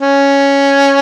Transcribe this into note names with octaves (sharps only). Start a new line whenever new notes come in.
C#4